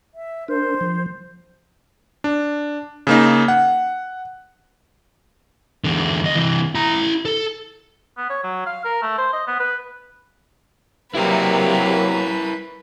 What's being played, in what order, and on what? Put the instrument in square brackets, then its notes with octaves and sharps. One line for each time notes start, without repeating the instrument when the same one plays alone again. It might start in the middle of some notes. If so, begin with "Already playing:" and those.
[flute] E5
[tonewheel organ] D4 A#4 [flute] C5
[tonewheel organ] F3
[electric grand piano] D4
C#3 A#3 D#4
F#5
[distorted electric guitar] E2 D3
E2 D#5
C3 E3
E4 A#5
A4
[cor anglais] B3
C#5
F#3
F5
A#4
A3
C5
D#5
B3
B4
[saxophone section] C3 A#3 [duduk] F#3 [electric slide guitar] E4 A#4 [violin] B4